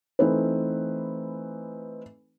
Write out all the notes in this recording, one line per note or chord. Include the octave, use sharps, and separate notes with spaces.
E3 A3 C4 D#4 B4